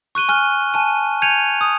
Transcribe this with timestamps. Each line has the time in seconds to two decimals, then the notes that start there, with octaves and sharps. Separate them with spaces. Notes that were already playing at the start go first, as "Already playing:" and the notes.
0.15 C#6 F#6 D#7 G7
0.29 G#5 F6 F#6 G7
0.74 G#5 A5 D#7
1.22 G#5 G6 G#6 C#7 D#7 F7
1.61 D#6